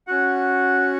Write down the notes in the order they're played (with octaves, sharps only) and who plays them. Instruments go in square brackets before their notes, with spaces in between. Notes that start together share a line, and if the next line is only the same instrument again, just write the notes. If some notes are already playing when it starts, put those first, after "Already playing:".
[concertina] C#4 F#4 F#5